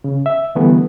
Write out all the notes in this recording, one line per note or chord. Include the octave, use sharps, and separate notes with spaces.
C#3
E5
D3 E3 G3 A3 B3